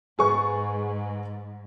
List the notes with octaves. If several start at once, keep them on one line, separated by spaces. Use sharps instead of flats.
G#2 G#4 B4 C#6